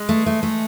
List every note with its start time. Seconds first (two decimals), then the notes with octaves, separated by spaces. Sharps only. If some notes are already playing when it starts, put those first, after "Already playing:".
Already playing: G#3
0.09 A3
0.26 A3
0.43 A3